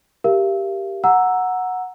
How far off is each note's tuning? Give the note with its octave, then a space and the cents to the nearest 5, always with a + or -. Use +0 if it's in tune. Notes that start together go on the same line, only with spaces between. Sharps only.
G4 +0 A#4 +0 F5 -40
F#5 -10 A#5 +0 E6 +0